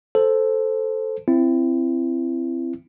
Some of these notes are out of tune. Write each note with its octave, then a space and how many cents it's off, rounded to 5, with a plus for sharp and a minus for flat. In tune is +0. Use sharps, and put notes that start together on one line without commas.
A4 +0 C5 +0
C4 +0 E4 +25